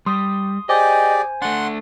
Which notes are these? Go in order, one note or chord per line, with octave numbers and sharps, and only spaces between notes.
G3 C6 D#6
G4 G#4 C5 D5 D#5 G#5
A3 D4 F#5 C6